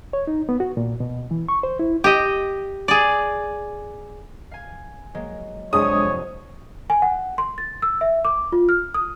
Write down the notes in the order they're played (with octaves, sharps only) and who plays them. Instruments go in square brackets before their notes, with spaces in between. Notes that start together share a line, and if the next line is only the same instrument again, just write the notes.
[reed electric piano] C#5
D#4
B3
F#4
A#2
B2
E3
C#6
C5
E4
[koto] G4 D#5
G#4 D5
[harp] F5 G#5
F#3 G#3 A#3
[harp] C2 F2 [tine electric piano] G#3 D4 G#4 [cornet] C#5 [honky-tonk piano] D#6
[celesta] G#5
F#5
C6
A6
E6
E5
D6
F4
F6
D#6